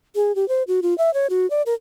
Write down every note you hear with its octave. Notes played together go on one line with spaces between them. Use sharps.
G#4
G4
C5
F#4
F4
E5
C#5
F#4
D5
A#4